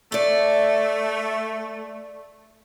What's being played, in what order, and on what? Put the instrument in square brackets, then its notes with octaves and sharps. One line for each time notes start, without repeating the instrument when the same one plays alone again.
[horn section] A3 [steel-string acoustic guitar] A4 D5